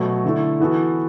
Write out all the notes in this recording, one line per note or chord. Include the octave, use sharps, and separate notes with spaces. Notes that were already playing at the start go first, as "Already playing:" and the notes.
Already playing: B2 F#3 A3
D3 A3 E4 A4
E3 B3 F#4 A4